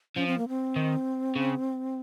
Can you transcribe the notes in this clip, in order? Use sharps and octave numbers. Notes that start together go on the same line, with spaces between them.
F3 C#4
C4
A#3
C4
D#3
C#3